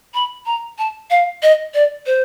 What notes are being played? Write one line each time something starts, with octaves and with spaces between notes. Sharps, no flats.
B5
A#5
A5
F5
D#5
D5
C5